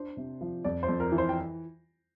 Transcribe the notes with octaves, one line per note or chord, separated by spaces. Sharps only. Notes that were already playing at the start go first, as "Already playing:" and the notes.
Already playing: D4 C5
C3
F3
F2 D5
C5
F2
A#4
E3
C5
G5